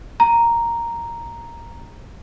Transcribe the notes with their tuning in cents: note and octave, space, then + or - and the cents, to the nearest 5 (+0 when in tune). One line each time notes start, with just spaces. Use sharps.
A#5 +0